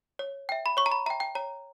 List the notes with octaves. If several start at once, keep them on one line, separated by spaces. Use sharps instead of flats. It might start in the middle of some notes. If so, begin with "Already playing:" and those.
C#5
E5 G5
B5
C#5 C#6
A#5
B5
E5 G5 A#5
G5
C#5 A#5